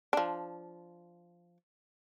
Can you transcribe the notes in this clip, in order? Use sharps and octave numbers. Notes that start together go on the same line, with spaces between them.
F3 D4